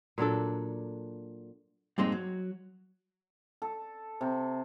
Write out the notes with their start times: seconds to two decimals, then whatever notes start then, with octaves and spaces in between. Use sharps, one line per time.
0.18 A#2 F#3 D4 A4
1.98 G2 A#2 G#3 C4 D#4
2.12 F#3
3.62 A4
4.21 C3